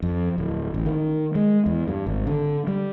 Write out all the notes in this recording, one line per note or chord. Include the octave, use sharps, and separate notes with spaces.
F2
D1
A1
D#3
G#3
E2
G2
G#1
D3
G3